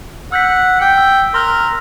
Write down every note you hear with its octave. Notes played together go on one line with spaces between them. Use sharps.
F#5 E6 G6 B6
G5
E6
A#4 C6 F6 F#6